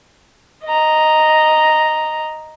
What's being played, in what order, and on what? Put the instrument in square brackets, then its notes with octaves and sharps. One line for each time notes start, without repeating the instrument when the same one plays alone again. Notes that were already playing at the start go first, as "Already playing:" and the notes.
[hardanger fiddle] D#5 A#5